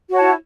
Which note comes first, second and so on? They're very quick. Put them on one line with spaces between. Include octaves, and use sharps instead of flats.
F#4 C#5 A5 E4